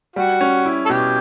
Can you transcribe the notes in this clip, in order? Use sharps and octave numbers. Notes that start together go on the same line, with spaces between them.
G3 F#4
C#4
E4
A4
B2 G4